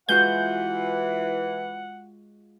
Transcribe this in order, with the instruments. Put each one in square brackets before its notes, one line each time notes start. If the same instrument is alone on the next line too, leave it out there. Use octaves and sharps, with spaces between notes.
[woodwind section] E3 [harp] G#3 F4 F#4 [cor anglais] F#5 [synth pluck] G6